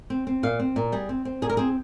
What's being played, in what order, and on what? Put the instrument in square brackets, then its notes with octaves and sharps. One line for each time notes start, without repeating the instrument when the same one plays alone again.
[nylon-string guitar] C4
C4
A#2 F5
C4
A#2
G3 G#4
C4
C4
A#2 G#4
A#4
C4 G#4